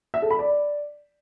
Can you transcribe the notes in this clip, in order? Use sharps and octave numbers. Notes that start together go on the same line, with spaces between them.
E5
A4
B5
D5